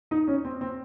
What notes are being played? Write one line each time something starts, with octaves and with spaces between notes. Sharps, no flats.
D#4
C#4
C4
C4